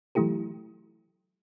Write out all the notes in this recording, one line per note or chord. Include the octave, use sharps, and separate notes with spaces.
E3 F#3 A3 E4 G4 A4